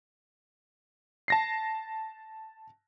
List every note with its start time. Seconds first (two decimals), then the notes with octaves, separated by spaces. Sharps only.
1.28 A5 A#6 C7